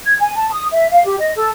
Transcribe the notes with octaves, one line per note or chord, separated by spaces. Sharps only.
G#6
G#5
A5
D#6
E5
F5
G4
D#5
A4